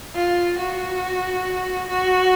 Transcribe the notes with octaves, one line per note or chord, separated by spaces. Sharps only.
F4
F#4
F#4